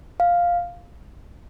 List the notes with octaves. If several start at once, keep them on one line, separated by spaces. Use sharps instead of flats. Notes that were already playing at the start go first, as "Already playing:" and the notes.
F5